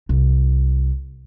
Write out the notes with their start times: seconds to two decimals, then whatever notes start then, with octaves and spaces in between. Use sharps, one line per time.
0.09 C2